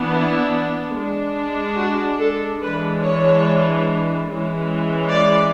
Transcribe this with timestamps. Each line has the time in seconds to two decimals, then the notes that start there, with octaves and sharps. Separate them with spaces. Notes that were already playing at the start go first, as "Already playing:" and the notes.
Already playing: E3 B3 D4
0.11 E4
0.95 G#3 D4
1.78 F#4
2.19 A4
2.61 E3 G#3 D4 B4
3.02 C#5
4.27 E3 G#3 C#4
5.11 D5